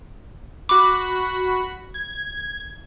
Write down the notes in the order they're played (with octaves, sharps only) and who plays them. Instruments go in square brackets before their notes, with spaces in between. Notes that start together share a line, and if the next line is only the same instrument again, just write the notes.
[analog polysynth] F#4 B5 [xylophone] D6
[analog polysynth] G#6